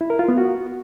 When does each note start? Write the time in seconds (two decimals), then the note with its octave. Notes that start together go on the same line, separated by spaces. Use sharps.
0.01 E4
0.10 A#4
0.19 F4
0.28 B3
0.38 F#4